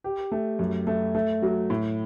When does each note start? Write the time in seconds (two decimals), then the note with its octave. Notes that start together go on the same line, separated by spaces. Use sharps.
0.04 G4
0.32 A3
0.59 F#2
0.87 A3
1.15 A3
1.42 F#3
1.70 A2